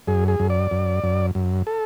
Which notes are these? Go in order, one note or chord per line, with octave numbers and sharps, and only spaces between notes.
F#2 G#4
G#4
F#2
D5
F#2
F#2
F#2
A4